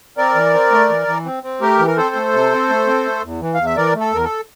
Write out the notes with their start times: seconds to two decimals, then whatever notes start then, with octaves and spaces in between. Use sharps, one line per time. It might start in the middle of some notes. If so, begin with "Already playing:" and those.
0.17 C4 A#4 D5
0.35 E3
0.53 C4
0.71 A3
0.89 E3
1.07 E3
1.25 C4
1.43 C4
1.61 A3 G4 A#4
1.79 E3
1.87 A#4
1.97 C4 A4 C5
2.15 A3
2.33 C3
2.51 C4
2.69 A3
2.87 C4
3.05 A3
3.23 E2
3.41 E3
3.54 E2 F5
3.66 E5
3.76 E3 A#4 D5
3.95 A3
4.00 A4
4.13 E2 A#4
4.24 A4